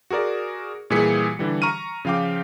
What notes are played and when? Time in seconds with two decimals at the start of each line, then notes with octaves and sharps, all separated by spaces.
0.10 F#4 G#4 A#4 D5
0.90 A#2 E3 G3 G#4 B6 C#7
1.39 D3 E3 G3
1.62 A#5 C#6 F6 D#7
2.05 C#3 F3 F5 G5 D6